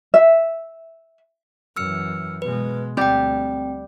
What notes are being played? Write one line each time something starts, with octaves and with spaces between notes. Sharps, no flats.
E5
F#2 E3 E6 F6 C#7
B2 G#3 B4
D2 G3 C4 G4 G5